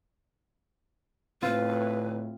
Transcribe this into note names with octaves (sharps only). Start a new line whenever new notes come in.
A2 C4 F4 B4